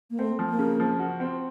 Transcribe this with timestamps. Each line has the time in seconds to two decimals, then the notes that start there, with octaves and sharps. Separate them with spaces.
0.10 A#3
0.19 A3 C4
0.39 F3
0.49 A#3
0.59 C#3
0.80 F3
0.99 F#4
1.20 C4